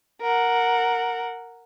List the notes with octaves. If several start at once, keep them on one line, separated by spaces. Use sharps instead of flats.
A#4 F#5